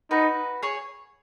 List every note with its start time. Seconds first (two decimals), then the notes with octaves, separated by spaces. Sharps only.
0.11 D#4 F#4 B4
0.63 G#4 C#5